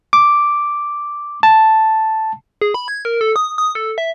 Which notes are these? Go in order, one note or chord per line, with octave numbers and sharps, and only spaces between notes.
D6
A5
G#4
B5
G#6
A#4
A4
D#6
D#6
A4
E5